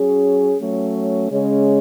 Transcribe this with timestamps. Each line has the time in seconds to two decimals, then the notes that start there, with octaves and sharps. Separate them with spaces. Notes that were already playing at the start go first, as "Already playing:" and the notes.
Already playing: F#3 C#4 G#4
0.58 F#3 A3 C#4
1.29 C#3 G#3 C#4